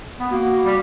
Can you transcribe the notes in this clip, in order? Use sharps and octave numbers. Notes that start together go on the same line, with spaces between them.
B3
A#3 F#4
G3